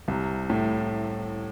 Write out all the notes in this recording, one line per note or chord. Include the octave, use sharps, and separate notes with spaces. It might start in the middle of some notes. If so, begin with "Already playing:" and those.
C2 C3
A2